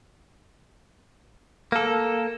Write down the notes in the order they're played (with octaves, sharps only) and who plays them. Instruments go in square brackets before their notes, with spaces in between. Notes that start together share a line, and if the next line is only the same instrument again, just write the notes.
[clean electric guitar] A#3 A4